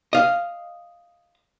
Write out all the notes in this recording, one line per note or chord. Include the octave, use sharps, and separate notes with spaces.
D#5 F5